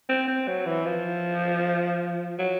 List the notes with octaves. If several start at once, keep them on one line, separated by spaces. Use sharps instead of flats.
C4
C4
F#3
E3
F3
F#3